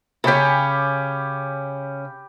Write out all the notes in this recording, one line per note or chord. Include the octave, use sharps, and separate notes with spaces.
C#3 C#4 G4 B5